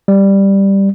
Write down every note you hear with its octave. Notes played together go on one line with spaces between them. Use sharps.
G3